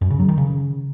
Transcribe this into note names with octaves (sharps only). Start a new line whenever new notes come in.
F#2
C#3
F#3
D#3
C#3